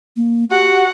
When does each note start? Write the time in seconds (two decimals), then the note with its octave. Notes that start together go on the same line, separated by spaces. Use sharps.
0.16 A#3
0.51 F#4 G4 F#5